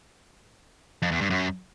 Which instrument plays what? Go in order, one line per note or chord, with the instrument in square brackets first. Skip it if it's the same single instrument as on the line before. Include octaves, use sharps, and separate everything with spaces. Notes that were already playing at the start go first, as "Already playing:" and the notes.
[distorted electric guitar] F2
E2
G2
F#2